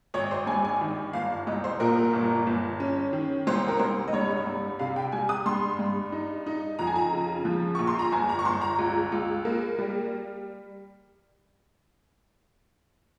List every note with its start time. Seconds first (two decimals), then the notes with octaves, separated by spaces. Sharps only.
0.14 G#1 C#5
0.31 C5
0.47 G2 G#5
0.65 G#5
0.81 D#3
1.13 G1 F5
1.47 C2 D#5
1.64 C5
1.80 A#2 A#4
1.97 A#4
2.14 G1
2.47 G1
2.80 C#4
3.13 D#3
3.47 C2 C5
3.68 A#4
3.79 C2 C5
4.08 D#5
4.13 G2 C#5
4.47 G2
4.79 C3 F5
4.96 G5
5.12 G3 G#5
5.29 D#6
5.46 G2 C6
5.79 G2
6.12 D#4
6.46 D#4
6.79 F2 A#5
6.87 G#5
6.96 A#5
7.12 C#3
7.45 F3
7.75 A#1 C#6
7.87 C6
7.99 A#5
8.12 G1 G#5
8.29 A#5
8.39 C#6
8.45 G1 C6
8.61 A#5
8.79 C#2
9.12 C#2
9.45 A#3
9.79 G3